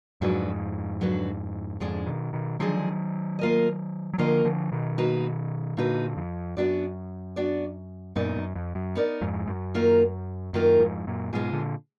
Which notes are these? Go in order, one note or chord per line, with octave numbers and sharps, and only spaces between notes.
F2 G#2 D3 F#3 D4 F#4 B4
D3 F#3 D4 F#4 B4
F2 G#2 D3 F3 G#3 D4 G#4
B2 D#3
B2 D#3
D3 D#3 F3 F#3 G#3 D4 G#4
A#3 F4 A#4 D#5
F#3
D3 F3 A#3 F4 A#4 D#5
D3 F3
B2 D#3
A#3 D#4 F#4 B4
A#2 D3 A#3 D#4 F#4 B4
F2
F#2 B3 D4 F#4 D5
B3 D4 F#4 D5
F#2 A#2 B3 D#4 A#4 D5
F#2
F2
F#2
B3 D#4 A#4 D5
F2 G#2
F#2
D#3 A#3 F4 A#4
F#2 D#3 A#3 F4 A#4
F2 G#2
F#2 A#2
G#2 B2 G#3 B3 F4 G#4
A#2 D3